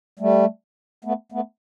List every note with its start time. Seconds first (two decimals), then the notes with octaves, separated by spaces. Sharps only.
0.19 G3 A3
1.05 A3 B3
1.32 A3 B3